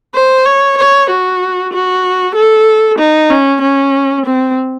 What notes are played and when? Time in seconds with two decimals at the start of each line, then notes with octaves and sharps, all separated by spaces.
0.15 C5
0.46 C#5
0.78 C#5
1.10 F#4
1.73 F#4
2.35 A4
2.99 D#4
3.30 C#4
3.61 C#4
4.25 C4